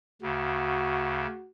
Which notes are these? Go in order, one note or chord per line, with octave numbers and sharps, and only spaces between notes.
D2 C#3 F#4